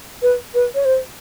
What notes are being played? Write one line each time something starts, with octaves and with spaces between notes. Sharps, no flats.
B4
B4
C#5
C5